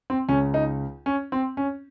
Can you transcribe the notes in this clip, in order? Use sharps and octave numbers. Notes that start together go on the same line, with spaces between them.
C4
C#2 C#3 C#4
D#4
C#4
C4
C#4